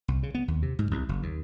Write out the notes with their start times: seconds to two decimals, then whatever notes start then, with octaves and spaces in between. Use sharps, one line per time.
0.08 C2
0.23 C#3
0.35 B3
0.48 D#2
0.62 C3
0.79 G#2
0.91 C2
1.09 F#1
1.23 D#2